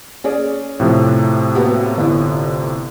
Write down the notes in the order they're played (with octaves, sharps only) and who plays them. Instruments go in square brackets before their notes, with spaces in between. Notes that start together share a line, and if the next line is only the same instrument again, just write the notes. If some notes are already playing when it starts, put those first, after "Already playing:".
[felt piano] C#4 G#4 D5
[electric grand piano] A2 C3 F3
[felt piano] B3 F#4 G4
G1 E4